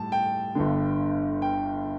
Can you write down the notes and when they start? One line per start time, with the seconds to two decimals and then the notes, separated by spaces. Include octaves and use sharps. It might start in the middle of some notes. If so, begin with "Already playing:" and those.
Already playing: A2 G3 A5
0.12 G5
0.55 G1 G2 D3
1.42 G5